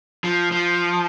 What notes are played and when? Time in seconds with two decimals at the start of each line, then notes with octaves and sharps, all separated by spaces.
0.24 F3
0.52 F3